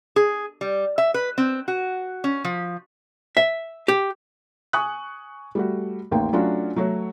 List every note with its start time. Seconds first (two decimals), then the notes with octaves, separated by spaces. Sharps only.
0.16 G#4
0.61 G3
0.98 E5
1.14 B4
1.38 C4
1.68 F#4
2.24 C#4
2.44 F3
3.37 E5
3.88 G4
4.73 G#5 C#6 D#6 F#6
5.55 G3 A3 F#4
6.11 A1 D#2 A#3 G5
6.33 F#3 A3 C#4 D4 F4 F#4
6.76 F#3 A3 F#4 C#5